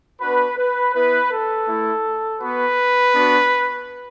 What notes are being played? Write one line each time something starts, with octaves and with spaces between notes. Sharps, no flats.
B3 D4 F#4 B4
B4
B3 E4 B4
A4
A3 E4
B3 F#4 B4
B3 D4 F#4